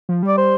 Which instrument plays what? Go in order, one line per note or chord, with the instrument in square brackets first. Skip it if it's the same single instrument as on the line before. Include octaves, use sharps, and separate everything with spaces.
[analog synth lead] F3
[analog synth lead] G3 [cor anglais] D5
[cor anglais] C5